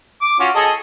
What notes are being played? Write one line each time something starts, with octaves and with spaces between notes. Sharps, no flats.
D6
C#4 F4 F#4
G#4 A4 D#5